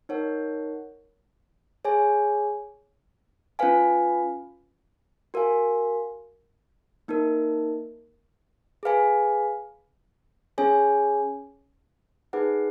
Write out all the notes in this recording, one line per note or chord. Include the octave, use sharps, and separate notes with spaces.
D#4 A#4 C#5 F#5
G#4 C#5 G#5
C#4 F4 B4 F5 G#5
F#4 A#4 F5 G#5
A#3 D#4 A#4
G#4 B4 F5 G#5
C#4 G#4 C#5 G#5
D#4 G#4 B4 F#5